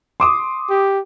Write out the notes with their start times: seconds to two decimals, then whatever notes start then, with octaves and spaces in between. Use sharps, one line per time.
0.20 C6 D6 D#6
0.70 G4